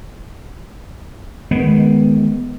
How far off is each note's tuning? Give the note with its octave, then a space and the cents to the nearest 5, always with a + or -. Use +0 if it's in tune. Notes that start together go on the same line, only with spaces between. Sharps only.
D#3 +0 G#3 +20 B3 +0